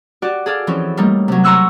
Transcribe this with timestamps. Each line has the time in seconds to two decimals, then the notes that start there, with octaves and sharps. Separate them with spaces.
0.22 F#4 G4 D5
0.46 G#4 A4 D5 F5
0.67 E3 F3 C4 C#4
0.97 G3 A3 A#3 D#4
1.28 C3 F#3
1.44 A#5 C6 C#6 E6 F#6